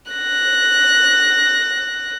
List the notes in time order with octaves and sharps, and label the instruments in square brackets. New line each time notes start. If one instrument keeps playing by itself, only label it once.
[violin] F#6 A#6